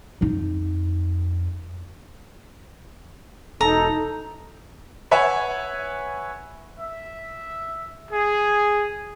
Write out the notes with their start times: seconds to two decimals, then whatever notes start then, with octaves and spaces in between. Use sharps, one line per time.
0.21 F2 D#4
3.61 E1 D#4 A4 A#5
5.11 B4 C#5 E5 F#5 G#5
6.80 E5
8.11 G#4